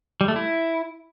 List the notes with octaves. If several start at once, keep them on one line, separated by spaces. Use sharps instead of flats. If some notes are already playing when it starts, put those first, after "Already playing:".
G3
A3
E4